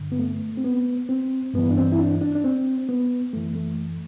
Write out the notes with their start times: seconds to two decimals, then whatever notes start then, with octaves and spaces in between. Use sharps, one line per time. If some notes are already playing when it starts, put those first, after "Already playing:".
Already playing: G2 D3
0.12 B3
0.19 A3
0.57 C4
0.64 B3
1.09 C4
1.54 G2 E3 B3
1.71 D4
1.77 C4
1.92 E4
1.99 D4
2.21 D4
2.35 D4
2.44 C4
2.89 B3
3.33 F#2 E3 A3
3.56 A3